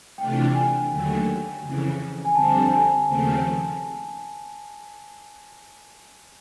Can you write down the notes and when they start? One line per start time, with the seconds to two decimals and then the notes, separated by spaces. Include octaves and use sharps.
0.18 C3 E3 A3 D4 F4 G5
0.54 G#5
0.91 D#2 D3 F#3 A3
1.63 F2 C#3 E3
2.25 G#5
2.35 F2 D3 G3 C4 A5
2.71 G#5
3.07 D#2 C#3 F3 A3 C4